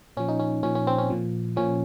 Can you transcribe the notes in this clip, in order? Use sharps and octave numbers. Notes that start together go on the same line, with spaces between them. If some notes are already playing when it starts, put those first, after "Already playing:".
A#2 F3 C#4
D#4
C#4
A#2 F3 C#4
C#4
C4
C#4
A#2 F3
A#2 F3 C#4